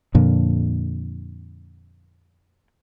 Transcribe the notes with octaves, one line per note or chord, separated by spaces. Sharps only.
F2 A#2 D3